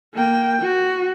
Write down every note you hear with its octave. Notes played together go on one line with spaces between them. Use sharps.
A#3 G5
F#4